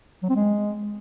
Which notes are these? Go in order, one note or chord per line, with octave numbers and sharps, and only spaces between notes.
F#3
C4
G#3